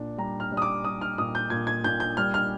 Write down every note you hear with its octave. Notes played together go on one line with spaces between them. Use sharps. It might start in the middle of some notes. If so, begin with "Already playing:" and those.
Already playing: A#2 D4
G3 A#5
F6
G3
D#6
D6
G3 D#6
F6
A#2 D#6
G6
A#2 G#6
G#6
A#2 G6
G6
G3 F6
F6